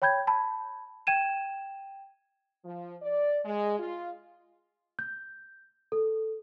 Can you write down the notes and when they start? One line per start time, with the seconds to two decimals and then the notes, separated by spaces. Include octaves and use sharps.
0.02 C#5 G5 B5 G6 G#6
0.27 A5 B5
1.07 G5 G#6 D#7 E7
2.65 F3
3.02 D5
3.45 G#3
3.79 F4
4.99 G6
5.92 A4